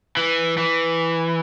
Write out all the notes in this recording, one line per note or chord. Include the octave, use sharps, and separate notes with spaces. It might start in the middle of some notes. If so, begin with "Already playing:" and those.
E3
E3